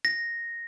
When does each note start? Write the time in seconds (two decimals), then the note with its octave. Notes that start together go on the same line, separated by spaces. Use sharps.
0.05 A#6